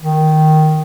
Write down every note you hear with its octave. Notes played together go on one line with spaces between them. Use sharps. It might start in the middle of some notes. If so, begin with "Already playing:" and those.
D#3